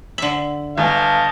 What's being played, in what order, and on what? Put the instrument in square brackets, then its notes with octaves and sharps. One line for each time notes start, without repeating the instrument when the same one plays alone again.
[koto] D3 E5 [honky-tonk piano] F#7
[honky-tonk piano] G1 [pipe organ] D#5 A5 [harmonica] F5